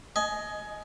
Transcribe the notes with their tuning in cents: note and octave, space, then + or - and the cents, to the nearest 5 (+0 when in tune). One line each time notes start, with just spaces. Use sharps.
D#5 +0 G#5 +20